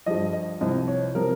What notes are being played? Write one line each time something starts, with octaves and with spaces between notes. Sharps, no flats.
G2 F3 D#5
D#5
C2 C3 F3 D#5
C#5
C3 F3 A#4